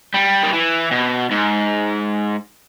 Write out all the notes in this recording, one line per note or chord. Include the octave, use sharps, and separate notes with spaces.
G3
D#3
E3
B2
G#2